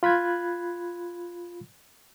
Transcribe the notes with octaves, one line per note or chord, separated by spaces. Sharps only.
F4 B5 F#6 G#6